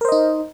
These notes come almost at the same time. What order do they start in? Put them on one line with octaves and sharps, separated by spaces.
A#4 C5 D#5 D#4